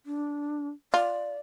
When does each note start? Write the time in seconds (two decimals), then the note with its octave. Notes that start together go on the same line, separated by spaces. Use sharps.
0.06 D4
0.94 F4 D5